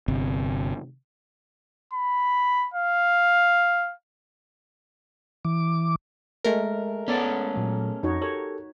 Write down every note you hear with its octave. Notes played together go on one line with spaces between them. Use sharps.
G1 C3
B5
F5
E3 D6
G#3 A3 A#4
B3 C#4 A4 D5
A#2 F#3
F2 D#4 F#4 C#5
G4 A4 A#4 C#5